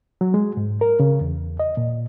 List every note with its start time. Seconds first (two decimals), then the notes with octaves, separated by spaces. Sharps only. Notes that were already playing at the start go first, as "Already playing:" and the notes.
0.21 F#3
0.34 G#3
0.57 G#2
0.81 A#4
1.00 C#3
1.21 E2
1.60 D#5
1.77 A#2